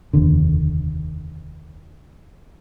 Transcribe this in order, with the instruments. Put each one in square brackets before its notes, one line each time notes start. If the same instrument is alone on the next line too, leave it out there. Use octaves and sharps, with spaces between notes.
[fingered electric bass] F1 D#2 D3